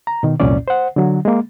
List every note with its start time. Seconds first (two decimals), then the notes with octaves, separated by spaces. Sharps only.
0.07 A#5
0.23 B2 D#3
0.40 C2 F2 A#2 C#4 D5
0.68 C5 F#5
0.96 D3 F#3
1.25 G#3 A#3